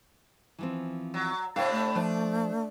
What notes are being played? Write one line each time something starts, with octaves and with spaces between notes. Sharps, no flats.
E3 F3 C4
F#3
A2 C3 D4 C#5 F5 G5
A3
F3 D4